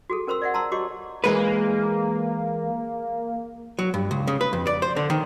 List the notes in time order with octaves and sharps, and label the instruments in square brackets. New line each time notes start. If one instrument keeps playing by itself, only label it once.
[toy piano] F#4 G#4 A4
C#4 A#4 C5 C6 E6
D5 E5 F#5
A5 A#5 C6 E6
F#4 G4 C#5 D#5 C6 D6
[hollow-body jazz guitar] E3 G#3 B4 [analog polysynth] A#3
[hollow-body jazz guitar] F#3
G2
C#2
C#3
B4
F2
D5
C5
D3
D#3